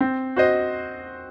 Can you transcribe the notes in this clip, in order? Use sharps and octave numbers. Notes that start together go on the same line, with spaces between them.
C4
F#4 C5 D#5